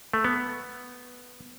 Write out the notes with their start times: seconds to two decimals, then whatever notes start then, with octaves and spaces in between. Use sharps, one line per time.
0.14 A3
0.24 B3